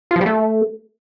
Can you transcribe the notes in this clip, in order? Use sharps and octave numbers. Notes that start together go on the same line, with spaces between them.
F4
F3
G3
A3